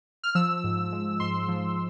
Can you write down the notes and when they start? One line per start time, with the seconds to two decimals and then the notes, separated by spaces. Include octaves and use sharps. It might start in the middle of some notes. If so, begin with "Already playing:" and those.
0.24 F6
0.35 F3 E6
0.64 G#2
0.92 G#3
1.20 G#2 C6
1.48 F3